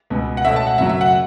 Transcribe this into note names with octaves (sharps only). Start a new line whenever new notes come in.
C#2 B2 B3
F#5
B2 A3 C#4 E5
A5
F#5
F#2 C#3 F#3 E5
E5
F#5